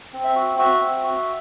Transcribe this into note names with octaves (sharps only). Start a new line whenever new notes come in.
C4
E5
F#4
F#4 E5
C4
F#4